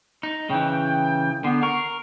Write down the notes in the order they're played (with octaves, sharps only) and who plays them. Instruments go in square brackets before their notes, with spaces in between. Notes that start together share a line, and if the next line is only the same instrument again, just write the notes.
[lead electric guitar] D#4
[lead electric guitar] C#3 E3 [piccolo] G5
[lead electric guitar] D3 [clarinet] B3 [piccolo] C7
[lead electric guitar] A#4 [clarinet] C#6